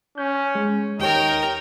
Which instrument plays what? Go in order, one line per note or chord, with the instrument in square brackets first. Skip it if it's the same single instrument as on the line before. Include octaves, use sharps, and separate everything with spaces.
[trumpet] C#4 [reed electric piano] G6
[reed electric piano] G#3
[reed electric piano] D#2 G4 C#5 [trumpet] D#4 [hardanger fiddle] A#4 G5